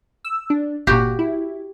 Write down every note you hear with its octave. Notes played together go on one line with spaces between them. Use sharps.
E6
D4
G1 A#2 F#4 G4
E4